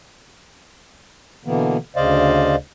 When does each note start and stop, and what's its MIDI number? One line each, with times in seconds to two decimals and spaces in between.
1.45 1.77 47
1.45 1.77 50
1.45 1.77 52
1.45 1.77 58
1.45 1.77 59
1.96 2.56 38
1.96 2.56 49
1.96 2.56 72
1.96 2.56 74
1.96 2.56 75
1.96 2.56 77